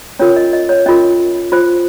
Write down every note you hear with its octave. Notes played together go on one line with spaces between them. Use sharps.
C#4 F4 A#4 C#5
D#5
D#5
C#5
C#4 F4 A#4 D#5
F4 C5